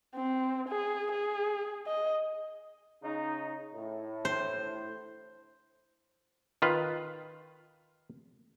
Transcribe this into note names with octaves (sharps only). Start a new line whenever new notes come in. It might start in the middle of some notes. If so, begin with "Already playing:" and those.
C4
G#4
G#4
D#5
C#3 D#4
A2
C5
D#3 F4 B4